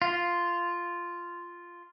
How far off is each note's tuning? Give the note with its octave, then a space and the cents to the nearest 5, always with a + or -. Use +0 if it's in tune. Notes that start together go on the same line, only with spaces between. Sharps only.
F4 -5